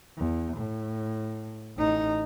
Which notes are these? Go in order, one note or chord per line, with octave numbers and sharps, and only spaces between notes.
E2
A2
A1 D#4